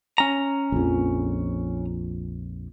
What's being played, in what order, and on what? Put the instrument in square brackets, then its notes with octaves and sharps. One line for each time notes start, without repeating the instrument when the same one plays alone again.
[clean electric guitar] C#4 A#5
[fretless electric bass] A#1 F2